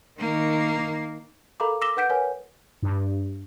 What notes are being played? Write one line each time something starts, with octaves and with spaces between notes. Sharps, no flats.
D#3 A#3
A4 A#4 F5 A#5 B5 D6
D6 E6 A#6 B6 E7 G7
B4 F#5 G6 B6 D7
A#4 B4 C#5 G#5
G2